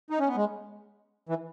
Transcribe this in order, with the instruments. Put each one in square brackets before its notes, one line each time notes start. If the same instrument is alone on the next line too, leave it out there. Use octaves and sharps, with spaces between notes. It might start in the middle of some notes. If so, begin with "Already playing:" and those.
[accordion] D#4
C#4
B3
G#3
E3